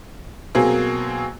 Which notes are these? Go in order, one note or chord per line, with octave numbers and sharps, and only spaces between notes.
B2 F#3 A#3 C4 G#4